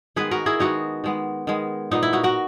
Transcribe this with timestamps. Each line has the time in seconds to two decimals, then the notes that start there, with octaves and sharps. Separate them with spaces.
0.16 D#3 G#3 B3 G#4 B4
0.31 F#4 A#4
0.46 E4 G#4
0.60 D#3 G#3 B3 D#4 F#4
1.04 D#3 G#3 B3
1.47 D#3 G#3 B3
1.91 A#2 G#3 B3 D#4
2.03 E4
2.13 D#4 F#4
2.24 F#4 A#4